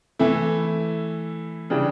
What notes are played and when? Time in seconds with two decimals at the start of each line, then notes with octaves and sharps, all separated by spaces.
0.19 E3 A3 E4
1.70 C#3 E3 G3 D4